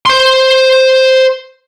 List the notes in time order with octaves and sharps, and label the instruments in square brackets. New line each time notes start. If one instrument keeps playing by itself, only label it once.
[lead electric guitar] C5 C6